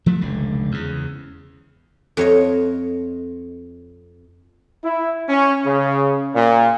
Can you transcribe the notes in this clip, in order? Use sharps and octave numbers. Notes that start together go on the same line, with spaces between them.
F3 F#3 A3
F1 C#2 D3
E2 C#3
F2 C#5 D#5
E4
C#4
C#3
A#2